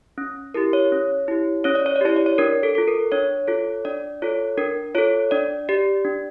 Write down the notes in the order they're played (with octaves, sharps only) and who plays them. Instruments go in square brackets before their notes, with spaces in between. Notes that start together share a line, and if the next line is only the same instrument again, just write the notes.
[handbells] C#4
E4 G4 A#4
C#5
C#4
E4 G4
C#4 C#5
D5
C#5
D5
E4 G4 C#5
D5
C#5
D4 A#4
A4
F4 A4
A#4
D4 C#5
F4 A4
D4 D5
F4 A4 C#5
D4 A#4
F4 A4 C#5
D4 D5
G4 D5
D4